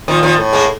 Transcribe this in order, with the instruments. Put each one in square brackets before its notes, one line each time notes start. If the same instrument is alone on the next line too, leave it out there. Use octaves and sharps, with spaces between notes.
[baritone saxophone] A#2 [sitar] D#3 F3
[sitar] D#3 F3
[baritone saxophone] A2
[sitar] G#3 A#3